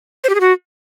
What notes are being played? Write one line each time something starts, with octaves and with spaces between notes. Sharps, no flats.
C5
G4
G#4
F#4